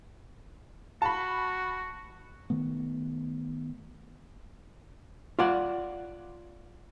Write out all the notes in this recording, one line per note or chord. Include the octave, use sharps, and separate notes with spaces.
F#4 A5 B5
D#3 A3 B3
F4 D5 F#5